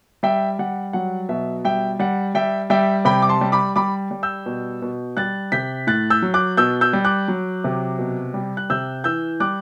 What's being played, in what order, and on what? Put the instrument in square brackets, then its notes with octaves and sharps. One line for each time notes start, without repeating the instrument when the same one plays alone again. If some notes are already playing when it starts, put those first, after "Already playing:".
[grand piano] G3 E5 G5
G3 F#5
F#3 F#5
B2 E5
G3 E5 G5
G3 F#5
G3 E5 G5
G3 E5 G5
C3 G5 B5
D6
A5 C6
G3
B5 D6
G3 B5 D6
G3
E6 G6
B2
B2
G3 F#6 A6
C3 G6 B6
A2 F#6 A6
E6 G6
F#3
D6 F#6
B2 E6 G6
E6 G6
G3
D6 F#6
F#3
C3
B2
G3
F#6
C3 E6 G6
E3 E6 G6
G3 D6 F#6